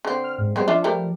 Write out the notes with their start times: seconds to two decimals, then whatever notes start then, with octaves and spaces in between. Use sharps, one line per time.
0.05 D3 C4
0.23 F6
0.38 G#2
0.56 G3 G#3 B3 C4
0.68 F3 D4 F4 E5
0.84 G3 A3 A#4